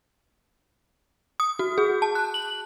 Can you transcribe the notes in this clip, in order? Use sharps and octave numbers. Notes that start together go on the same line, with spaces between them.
D#6
F#4
G#4
A5
F#6
F#7